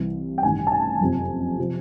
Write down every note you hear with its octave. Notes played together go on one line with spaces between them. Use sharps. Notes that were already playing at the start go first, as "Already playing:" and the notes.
Already playing: C2 C3 E3
G5
A1 G2 D#3 G#5
A5
G#5
F#1 F2 C3 F3
C3 F3